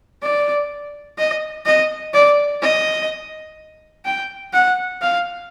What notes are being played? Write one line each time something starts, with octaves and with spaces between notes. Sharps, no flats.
D5
D#5
D#5
D5
D#5
G5
F#5
F5